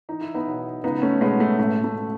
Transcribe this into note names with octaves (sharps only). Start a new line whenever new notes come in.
E3 D#4
E4
B3 D#4
B1
C#2 B3 D#4
A3 C#4
B2 G#3 B3
A3
A1 A3
A3